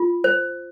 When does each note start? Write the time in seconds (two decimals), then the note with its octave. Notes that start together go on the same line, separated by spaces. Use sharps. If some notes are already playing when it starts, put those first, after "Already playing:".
Already playing: F4
0.24 C5